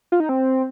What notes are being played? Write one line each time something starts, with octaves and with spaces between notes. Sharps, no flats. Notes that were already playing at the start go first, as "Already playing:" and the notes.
F4
D#4
C4